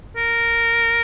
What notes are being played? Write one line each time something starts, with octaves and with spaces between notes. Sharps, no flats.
A#4